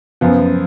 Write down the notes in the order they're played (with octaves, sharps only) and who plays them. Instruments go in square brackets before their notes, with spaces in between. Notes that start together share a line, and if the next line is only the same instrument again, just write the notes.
[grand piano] F#2 F3 B3